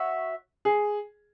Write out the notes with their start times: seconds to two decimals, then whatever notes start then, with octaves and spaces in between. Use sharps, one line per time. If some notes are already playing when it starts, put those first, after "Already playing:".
Already playing: F#4 C#5 E5
0.65 G#4